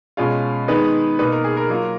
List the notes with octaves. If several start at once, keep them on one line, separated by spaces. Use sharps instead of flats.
B2 G#3 C#4 F4
D#3 G#3 B3 D#4 B4
B2 A#3 D#4 B4
A#4
G#4
A#4
F#3 A#3 F4